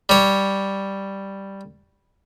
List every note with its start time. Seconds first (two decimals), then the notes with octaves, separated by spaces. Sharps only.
0.09 G3 C#5